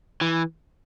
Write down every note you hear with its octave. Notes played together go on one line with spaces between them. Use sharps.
E3